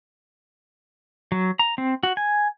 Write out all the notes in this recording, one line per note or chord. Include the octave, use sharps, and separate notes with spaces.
F#3
A#5
C4
F#4
G#5